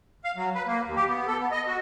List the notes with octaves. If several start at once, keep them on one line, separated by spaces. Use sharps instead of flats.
F5
F#3
B4
A#3
D#2
G4
B3
A4
B3
D#5
F#4